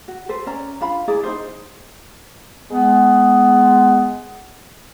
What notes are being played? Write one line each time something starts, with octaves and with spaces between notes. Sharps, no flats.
F#4
A4 B4 C5
C#4 D5 A#5
D4 F4 F5 B5
E4 G#4 D5 A#5
D#4 F4 C5
G#3 B3